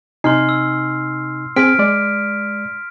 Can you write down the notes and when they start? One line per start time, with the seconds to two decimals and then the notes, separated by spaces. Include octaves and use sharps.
0.24 C3 D#4 G#5 C6 F6 C7
0.49 E6
1.56 C4 G#4 F6 B6 D7
1.79 G#3 D5